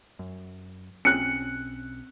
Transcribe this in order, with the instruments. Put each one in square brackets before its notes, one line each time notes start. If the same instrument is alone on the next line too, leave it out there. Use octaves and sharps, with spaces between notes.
[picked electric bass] F#2
[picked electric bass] B1 C4 C#4 [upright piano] F#6 C#7